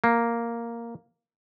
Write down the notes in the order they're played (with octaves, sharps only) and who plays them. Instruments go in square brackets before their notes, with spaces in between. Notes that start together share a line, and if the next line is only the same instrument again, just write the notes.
[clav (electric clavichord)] A#3